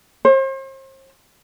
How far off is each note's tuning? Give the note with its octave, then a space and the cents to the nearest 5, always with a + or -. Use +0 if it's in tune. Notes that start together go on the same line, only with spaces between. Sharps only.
C5 +40